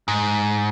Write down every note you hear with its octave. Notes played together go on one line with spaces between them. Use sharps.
G#2